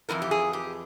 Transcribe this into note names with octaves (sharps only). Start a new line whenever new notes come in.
F2 C3 E3 A#4
G4
G#4
G4